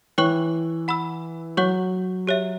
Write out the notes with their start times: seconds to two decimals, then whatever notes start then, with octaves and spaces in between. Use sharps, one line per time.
0.18 E3 C#5 G5 C#6 F#6
0.88 F#5 B5 E6
1.57 F#3 C#5 F#5 C#6 G6
2.27 G4 C#5 E5